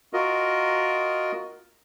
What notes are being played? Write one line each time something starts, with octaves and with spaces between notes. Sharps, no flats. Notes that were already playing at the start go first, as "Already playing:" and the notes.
F4 F#4 A#4 D#5